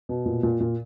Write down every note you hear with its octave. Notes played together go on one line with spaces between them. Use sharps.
B2
A#2
A#2
A#2